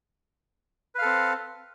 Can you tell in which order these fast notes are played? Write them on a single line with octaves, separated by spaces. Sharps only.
B4 F5 A4 C4